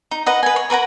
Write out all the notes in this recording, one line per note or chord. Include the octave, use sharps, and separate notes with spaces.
D#4
B4 D#5 F#5
B4 G#5
C#5
A#4 B4 F#5 A#5